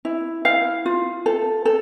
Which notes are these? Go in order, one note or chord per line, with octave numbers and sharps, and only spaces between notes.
E4
E4 F5
F4
A4
A4